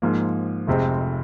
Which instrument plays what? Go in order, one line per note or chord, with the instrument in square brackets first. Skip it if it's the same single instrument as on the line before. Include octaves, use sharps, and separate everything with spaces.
[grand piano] G#2 F3 A#3
F1 F2 C3 G#3 C4